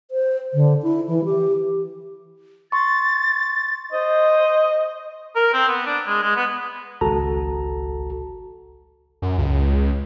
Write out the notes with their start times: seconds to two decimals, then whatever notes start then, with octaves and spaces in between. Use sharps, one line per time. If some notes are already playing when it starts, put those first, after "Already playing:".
0.11 C5
0.54 D3
0.83 E4
1.08 E3
1.25 G4
2.72 C6 C#6 A6
3.92 C5 D#5
5.36 A#4
5.54 C4
5.68 B3
5.86 D4
6.06 G#3
6.23 G#3
6.36 B3
7.01 G#1 C#2 F#4 A4 A5 A#5
9.22 F#2
9.38 C#2